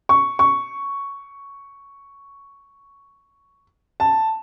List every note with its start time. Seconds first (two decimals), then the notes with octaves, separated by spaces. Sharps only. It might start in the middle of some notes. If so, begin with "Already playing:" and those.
0.09 C#6
0.39 C#6
4.00 A5